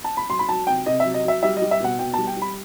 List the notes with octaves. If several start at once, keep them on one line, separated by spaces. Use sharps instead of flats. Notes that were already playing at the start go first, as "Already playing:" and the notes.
A5
B5
F#3 C6
B5
F#3 A5
C3 G5
C3 D#5
F#3 E5
D#5
F#3 E5
G3 E5
D#5
G3
E5
B2 F#5
B2 G5
G3 A5
G5
G3
B5